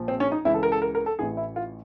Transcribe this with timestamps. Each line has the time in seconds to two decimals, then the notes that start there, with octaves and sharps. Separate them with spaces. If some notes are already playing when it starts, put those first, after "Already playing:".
Already playing: A#1 A#2 F3
0.08 C4
0.20 C#4
0.32 D#4
0.45 C#2 C#3 E3 E4
0.54 A4
0.63 A#4
0.72 A4
0.82 A#4
0.95 A#4
1.06 A4
1.19 A1 A2 E3 G#4
1.37 E4
1.56 F4